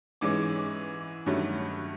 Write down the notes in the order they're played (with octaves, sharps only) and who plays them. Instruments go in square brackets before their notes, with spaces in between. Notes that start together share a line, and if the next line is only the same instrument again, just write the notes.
[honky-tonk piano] G#2 E3 G#3 C#4 D6
G2 D#3 F#3 A3 C#4